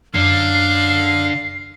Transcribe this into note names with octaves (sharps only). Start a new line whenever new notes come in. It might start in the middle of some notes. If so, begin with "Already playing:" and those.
F#2 D3 F5 C7